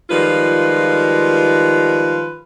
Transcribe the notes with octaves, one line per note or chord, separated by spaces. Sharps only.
D#3 F3 G3 G#3 F4 B4